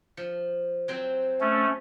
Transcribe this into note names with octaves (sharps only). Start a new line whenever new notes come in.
F3
F#3 C4 C5
A3 C#4